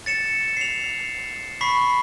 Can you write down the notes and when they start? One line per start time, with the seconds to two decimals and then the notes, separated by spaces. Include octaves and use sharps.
0.06 A6 C#7 E7
0.57 C7 F7
1.61 B5 C#6 B6 C7